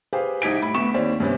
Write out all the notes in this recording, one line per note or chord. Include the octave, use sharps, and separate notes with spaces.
G4 G#4 B4 C5 F5 G5
C2 D#4 G4 G#6 B6 D7
A2 B5
D2 B3 C#6 B6 E7
D#2 C4 C#5 D5
G2 C3 B3 C#4